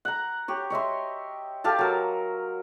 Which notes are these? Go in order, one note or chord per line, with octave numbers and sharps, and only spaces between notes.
F#5 A#5
G4 C#5
C#5 D#5 E5 C6
G4 A4 F5 A5
F#3 A#4